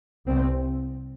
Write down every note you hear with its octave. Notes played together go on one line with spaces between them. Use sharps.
C2 C3 C4